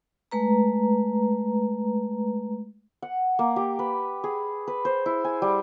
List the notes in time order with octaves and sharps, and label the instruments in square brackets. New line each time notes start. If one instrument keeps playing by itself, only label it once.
[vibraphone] G#3 A3 B4 A#5
[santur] F#5
A#3
G4
B4
G#4
B4
C5
E4
G#5
G3